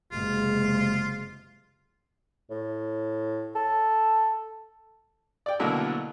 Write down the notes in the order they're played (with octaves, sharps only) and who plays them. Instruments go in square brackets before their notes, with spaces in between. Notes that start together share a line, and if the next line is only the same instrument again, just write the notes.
[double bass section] F#1 C3 G#3 [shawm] F4
[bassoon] A2
A4
[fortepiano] D5 G5
B2 D3 F#3 A3 A#3 E4